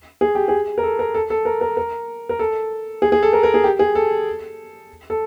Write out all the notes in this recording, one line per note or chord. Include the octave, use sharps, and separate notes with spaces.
G#4
G4
G#4
A#4
A4
A#4
A4
A4
A#4
A#4
A#4
A#4
A4
G#4
G#4
A4
A#4
A#4
G#4
G4
G#4
A4
A4